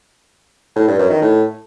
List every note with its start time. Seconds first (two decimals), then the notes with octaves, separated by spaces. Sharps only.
0.76 A2
0.87 G2
0.99 F#2
1.10 D#3
1.22 A2